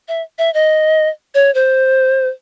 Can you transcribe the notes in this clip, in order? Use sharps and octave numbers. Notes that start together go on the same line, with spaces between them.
E5
E5
D#5
C#5
C5